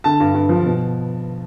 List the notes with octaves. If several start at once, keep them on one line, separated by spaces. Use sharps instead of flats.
D3 A5
G2
G2
F3
B2